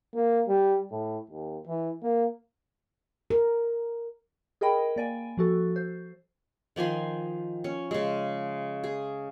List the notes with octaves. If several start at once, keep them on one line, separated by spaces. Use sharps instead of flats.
A#3
G3
A2
D#2
E3
A#3
A#4
G#4 A#4 D#5 G5 B5
A#3 D5 G#5
F3 F#4 A4
C5
D#3 F3 G#5 C6
C#4
C#3 G#3
G#4